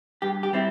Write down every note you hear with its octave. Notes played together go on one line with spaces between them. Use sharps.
G2 G4
G4
G3 C4 E4